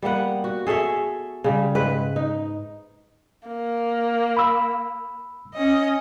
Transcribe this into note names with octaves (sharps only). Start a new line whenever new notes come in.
G3 A#3 B3 F#5
F#4
G#4 A4 C#5 E5
C#3 G3
G#2 B4
D#4
A#3
B5 E6
C#4 D#5